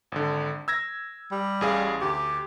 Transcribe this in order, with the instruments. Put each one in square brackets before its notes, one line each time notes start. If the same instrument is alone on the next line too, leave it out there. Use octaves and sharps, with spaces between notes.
[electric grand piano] G#1 D3
E6 G#6 A#6
[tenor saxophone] G3
[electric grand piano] A1 G#4 F5
[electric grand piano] D2 [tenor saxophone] G4